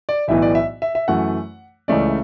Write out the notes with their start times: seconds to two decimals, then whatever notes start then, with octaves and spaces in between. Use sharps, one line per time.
0.09 D5
0.28 B1 A2 E3 B3 E5
0.42 D5
0.55 E5
0.82 E5
0.95 E5
1.08 F#2 E3 A3 F#5
1.88 C#2 C#3 E3 A3 C#4 D5
2.08 E5